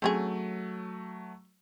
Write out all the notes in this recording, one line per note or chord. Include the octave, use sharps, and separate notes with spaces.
F#3 A3 C4 C#4 G#4